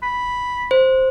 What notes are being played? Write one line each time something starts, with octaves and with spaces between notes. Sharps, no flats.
B5
C5